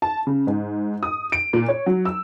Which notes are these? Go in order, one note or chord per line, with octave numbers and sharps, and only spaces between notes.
A5
C#3
G#2
D#6
D7
A#2
C#5
F#3
E6